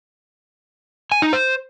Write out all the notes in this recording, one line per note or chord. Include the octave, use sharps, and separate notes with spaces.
G#5
D#4
C5